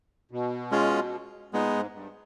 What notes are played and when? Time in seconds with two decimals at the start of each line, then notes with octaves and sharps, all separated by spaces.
0.31 B2
0.71 G#3 C#4 F4
1.52 A#2 G#3 B3 D#4
1.73 G#2
1.94 G2